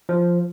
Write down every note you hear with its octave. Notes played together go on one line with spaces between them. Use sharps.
F3